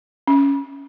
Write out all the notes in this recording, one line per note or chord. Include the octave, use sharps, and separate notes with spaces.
C#4